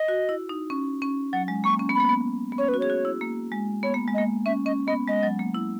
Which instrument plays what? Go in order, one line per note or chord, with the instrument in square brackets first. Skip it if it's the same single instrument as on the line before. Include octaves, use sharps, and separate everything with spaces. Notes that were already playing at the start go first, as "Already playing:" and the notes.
Already playing: [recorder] D#5
[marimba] F#4
E4
D#4
C#4
C#4
[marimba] F#3 [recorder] F#5
[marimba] G#3
[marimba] A#3 [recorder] C#6
[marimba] C#4
B3
[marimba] A#3 [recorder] B5
[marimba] B3
B3
[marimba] C#4 [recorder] C#5
[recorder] B4
[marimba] F#4
[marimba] G#4 [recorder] C#5
[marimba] F#4
E4
A#3
G#3
[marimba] B3 [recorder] C#5
[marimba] A#3
G#3
[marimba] A#3 [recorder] D#5
[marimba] C#4 [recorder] E5
[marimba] C#4 [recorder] D#5
[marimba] B3 [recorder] D#5
[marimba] G#3 [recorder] D#5
[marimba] F#3
A#3
E4